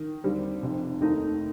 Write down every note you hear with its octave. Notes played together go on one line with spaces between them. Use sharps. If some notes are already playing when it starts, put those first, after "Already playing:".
Already playing: D#3
D#2 D3 G3 C4
F1 F2 C3
D#2 D#3 A3 D#4